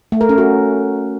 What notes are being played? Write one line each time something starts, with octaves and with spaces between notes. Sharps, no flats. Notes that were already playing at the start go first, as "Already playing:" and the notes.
A3
A#4
C#4
F#4